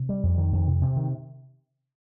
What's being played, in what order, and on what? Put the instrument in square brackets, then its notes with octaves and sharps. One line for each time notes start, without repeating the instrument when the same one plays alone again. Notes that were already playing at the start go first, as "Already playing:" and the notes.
Already playing: [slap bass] C3
G3
F2
D#3
F2
C3
C3
D#3